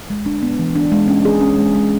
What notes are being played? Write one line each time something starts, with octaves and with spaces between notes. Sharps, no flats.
G#3
D4
B3
E3
D4
G#3
C#4
G#4
C#4
G#3
G#3